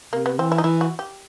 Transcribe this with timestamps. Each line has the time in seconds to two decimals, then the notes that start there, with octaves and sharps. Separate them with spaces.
0.13 C3 A#3
0.26 B3
0.39 E3 C4
0.52 E4
0.58 D#4
0.64 E3 E4
0.81 F#4
0.99 G4